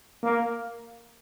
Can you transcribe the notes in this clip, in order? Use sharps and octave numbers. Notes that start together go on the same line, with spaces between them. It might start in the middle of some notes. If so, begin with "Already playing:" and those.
A#3